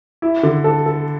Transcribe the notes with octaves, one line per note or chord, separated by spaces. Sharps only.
E4
D3
A4
A4